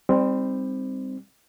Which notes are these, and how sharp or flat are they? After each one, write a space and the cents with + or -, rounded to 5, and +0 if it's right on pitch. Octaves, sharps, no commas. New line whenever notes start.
G3 +25 C4 +0 D#4 +0